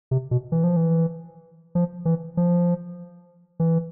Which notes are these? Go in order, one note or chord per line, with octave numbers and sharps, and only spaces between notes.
C3
B2
E3
F3
E3
F3
E3
F3
E3